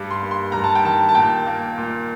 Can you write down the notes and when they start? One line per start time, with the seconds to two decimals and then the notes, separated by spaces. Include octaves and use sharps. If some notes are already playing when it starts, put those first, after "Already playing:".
Already playing: G2 G3
0.11 C6
0.22 A#3
0.31 C6
0.52 G2 A#5
0.64 A5
0.75 G5
0.84 D#3 A5
1.09 A5
1.15 A#2 G5
1.47 A#3
1.78 A#2